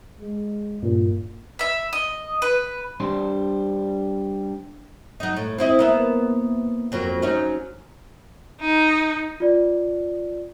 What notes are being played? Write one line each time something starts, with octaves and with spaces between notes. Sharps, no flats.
G#3
G2 A#2
E5 B5
D#5
B4
G3 D4 C5 C6
F#3 D#4
A2
C4 E4 D#5
A#3 B3 E5
F2 F#3 A#3
F#3 C#4 D#4
D#4
F4 D5